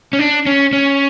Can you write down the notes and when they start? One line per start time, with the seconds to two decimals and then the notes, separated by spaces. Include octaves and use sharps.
0.13 C#4
0.19 D4
0.46 C#4
0.73 C#4